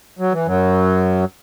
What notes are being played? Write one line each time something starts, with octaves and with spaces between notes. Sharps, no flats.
F#3
E3
F#2 F#3